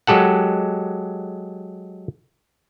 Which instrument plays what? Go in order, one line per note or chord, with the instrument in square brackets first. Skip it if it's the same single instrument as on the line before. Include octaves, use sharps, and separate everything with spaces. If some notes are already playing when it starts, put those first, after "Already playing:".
[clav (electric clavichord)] F#3 G#3 G4 A4 F#5